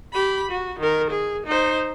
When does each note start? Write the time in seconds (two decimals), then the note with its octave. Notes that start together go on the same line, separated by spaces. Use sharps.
0.13 G4 B5
0.51 F#4
0.79 D#3 A#4
1.10 G#4
1.46 D#4 C5